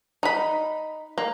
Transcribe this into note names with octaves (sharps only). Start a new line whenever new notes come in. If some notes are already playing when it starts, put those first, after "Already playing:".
D#4 B5
A#3